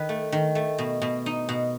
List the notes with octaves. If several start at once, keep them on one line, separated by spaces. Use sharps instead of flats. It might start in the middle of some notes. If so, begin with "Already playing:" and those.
Already playing: D#3 B4
A3
D#3
A3
B2
B2
D#4
B2